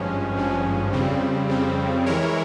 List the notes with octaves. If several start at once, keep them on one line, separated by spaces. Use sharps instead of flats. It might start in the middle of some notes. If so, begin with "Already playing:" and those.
Already playing: G#1 G2 F3 G#3 C#4
G#1 G2 F3 G#3 C#4
F2 C#3 G3 C4
F2 C#3 G3 C4
E3 G#3 E4 A#4 C#5